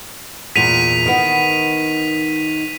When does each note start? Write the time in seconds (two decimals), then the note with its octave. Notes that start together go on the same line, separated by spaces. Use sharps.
0.56 E2 A#2 B6 D#7 F7
1.06 D#3 B3